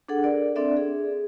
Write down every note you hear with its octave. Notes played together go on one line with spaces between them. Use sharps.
D4 G#4 A4 F#5
A#4 D5
C4 D4 A4 D5 E5
G#4